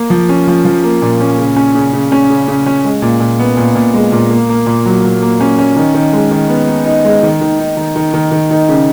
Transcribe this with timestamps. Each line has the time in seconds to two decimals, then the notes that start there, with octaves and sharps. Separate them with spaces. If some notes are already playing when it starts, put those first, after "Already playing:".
Already playing: A#3
0.10 F3
0.29 C#4
0.47 F3
0.65 F3
0.83 A#3
1.02 A#2
1.20 C#4
1.38 C#3
1.56 C#4
1.75 C#3
1.93 C#3
2.12 C#4
2.30 C#3
2.48 C#3
2.66 C#4
2.84 G#3
3.02 A#2
3.20 A#2
3.39 B3
3.57 A#2
3.75 A#2
3.94 G#3
4.12 A#2
4.31 A#3
4.49 A#3
4.66 A#2
4.86 F#3
5.04 F#3
5.22 A#3
5.41 C#4
5.59 C#4
5.76 D#3
5.94 D#3
6.13 G#3
6.31 D#3
6.49 B3
6.67 D#4
6.85 D#4
7.05 G#3
7.23 D#3
7.41 D#3
7.59 D#4
7.77 D#3
7.96 D#3
8.14 D#3
8.32 D#3
8.51 D#3
8.69 C#3